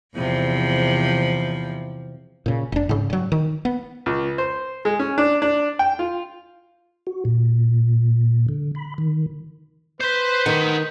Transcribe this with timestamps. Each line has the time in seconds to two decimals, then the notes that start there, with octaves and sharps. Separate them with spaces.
0.16 E2 C3 F3
2.46 A#2 C#3
2.72 F1 D4
2.89 G#2 C#3
3.10 G2 F#3
3.32 D#3
3.65 B3
4.06 C#2
4.38 C5
4.85 G#3
4.99 C#4
5.18 D4
5.42 D4
5.79 G5
5.99 F4
7.07 F#4
7.25 A#2
8.49 D3
8.75 B5
8.98 D#3
10.01 B4 C5 C6 G6 B6
10.46 D#3 C5 F#5